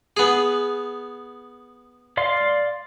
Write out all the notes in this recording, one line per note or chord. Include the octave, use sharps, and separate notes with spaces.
B3 G#4
D5 F5 C6